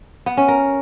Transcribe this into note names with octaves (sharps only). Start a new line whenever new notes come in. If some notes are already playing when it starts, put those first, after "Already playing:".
B3
C#4
A#4